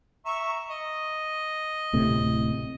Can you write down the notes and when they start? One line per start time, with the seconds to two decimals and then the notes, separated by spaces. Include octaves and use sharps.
0.25 E5 A#5 C#6
0.70 D#5
1.93 D1 A2 C3